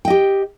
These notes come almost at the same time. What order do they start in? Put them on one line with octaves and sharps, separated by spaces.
G5 D#5 G4